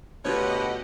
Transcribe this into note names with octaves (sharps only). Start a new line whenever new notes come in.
D2 B2 F4 G4 B4 C#5 D#5 F#5